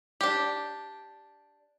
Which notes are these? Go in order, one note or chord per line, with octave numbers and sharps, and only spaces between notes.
D4 G4